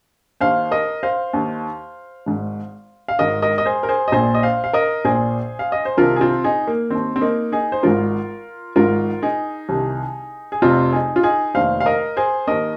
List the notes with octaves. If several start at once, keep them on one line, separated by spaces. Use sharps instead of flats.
D#2 D#3 C5 F5
A#4 D#5
C5 F5
D#2 D#3
G#1 G#2 D#3
F5
G#1 G#2 D#3 A#4 D#5
A#4 D#5
D#5
G#4 C5
A#4
G#4 C5
D#5
A#1 A#2 G#4 C5
D#5
C5 F5
F5
A#4 D#5
A#1 A#2 G#4 C5
F5
D#5
C5
C2 C3 D#3 F4 A#4
G#4
C4 F4
D#4 G#4
A#3
D#2 D#3 C4
C4
A#3 D#4
D#4 G#4
C5
G#1 G#2 D#3 F4 A#4
G#1 G#2 D#3 F4 A#4
D#4 G#4
C2 C3 D#3
G#4
F1 F2 C3 C4 F4
D#4 G#4
F4
D#4 G#4
F1 D#2 D#3 C5 F5
F5
A#4 D#5
G#4 C5
D#2 D#3 A#4 D#5